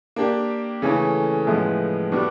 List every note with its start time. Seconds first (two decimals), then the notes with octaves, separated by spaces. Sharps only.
0.16 A#3 D4 G4
0.82 C#3 E3 A3 C#4
1.47 A2 F3 G#3 B3 E4
2.12 G3 B3 D4 F#4